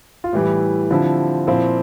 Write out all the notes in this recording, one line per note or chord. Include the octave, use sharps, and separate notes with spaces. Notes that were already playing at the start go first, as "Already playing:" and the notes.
F4
A2 E3 G3 G4
D3 F3 C4 E4
A#2 F3 C4 E4